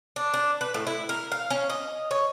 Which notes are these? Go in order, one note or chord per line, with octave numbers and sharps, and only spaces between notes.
D4
D4
B4
A2
E4
A#4
F5
C#4
D#5
C#5